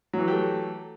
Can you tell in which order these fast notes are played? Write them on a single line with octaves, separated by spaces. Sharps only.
F#3 E3 F#4 G4 A3